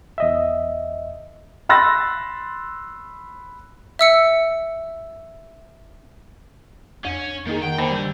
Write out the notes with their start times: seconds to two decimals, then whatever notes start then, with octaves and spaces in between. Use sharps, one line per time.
0.18 E2 D#5 E5
1.69 B5 C6 E6 F#6 A6 A#6
3.99 E5 E6 C#7
7.05 F2 C#4
7.47 D#3 A#3 D#4 G#4
7.63 D#3 F#5 G5
7.78 D3 A#3 C5 D#5 A5 B5
7.91 G3 G6